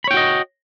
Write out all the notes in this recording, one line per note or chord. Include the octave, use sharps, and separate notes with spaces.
F#4 C#5 D#5 G5 B5